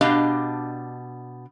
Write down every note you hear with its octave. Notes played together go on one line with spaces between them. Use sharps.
B2 D4 G4 D#5 F5